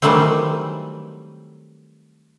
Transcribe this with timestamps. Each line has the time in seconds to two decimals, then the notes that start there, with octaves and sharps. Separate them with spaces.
0.02 D#3 E3 F#3 G3 A3 C4